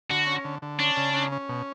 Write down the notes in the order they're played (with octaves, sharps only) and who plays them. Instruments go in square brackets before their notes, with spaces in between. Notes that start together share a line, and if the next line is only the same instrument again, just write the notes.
[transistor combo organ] D3 [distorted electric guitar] F#4
[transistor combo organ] C#4
D3
D3
[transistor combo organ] C#4 [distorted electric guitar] D4
[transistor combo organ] C#3
C#4
C#4
B2